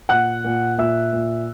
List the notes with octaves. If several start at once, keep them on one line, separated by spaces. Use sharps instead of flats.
A#2 F#5 F#6
A#2
A#2 E5 E6
A#2